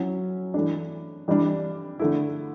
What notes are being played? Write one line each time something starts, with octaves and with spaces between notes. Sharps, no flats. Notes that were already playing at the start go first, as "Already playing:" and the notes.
Already playing: F#3 C#4 E4
E3 A3 D4
E3 G3 D4
D3 A3 E4